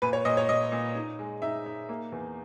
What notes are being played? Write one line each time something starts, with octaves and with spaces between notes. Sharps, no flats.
A#2 B4
C#5
A#2 D#5
C#5
A#2 D#5
A#2
D#4
G#3
D#4 E5
D#4
A#3
E2